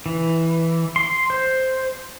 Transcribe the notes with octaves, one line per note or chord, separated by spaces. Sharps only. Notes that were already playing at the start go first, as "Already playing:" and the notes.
E3
C6
C5